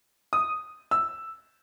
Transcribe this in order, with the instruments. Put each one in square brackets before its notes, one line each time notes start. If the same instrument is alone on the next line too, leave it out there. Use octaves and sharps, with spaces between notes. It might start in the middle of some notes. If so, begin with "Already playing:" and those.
[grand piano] D#6
E6